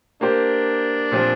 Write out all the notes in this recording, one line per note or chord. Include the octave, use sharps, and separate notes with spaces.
A#3 D4 G4 C5
A#2 F3 C4 G4